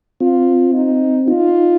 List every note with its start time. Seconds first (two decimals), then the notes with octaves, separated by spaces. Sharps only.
0.20 C4 F4
0.74 D#4
1.27 D#4 F4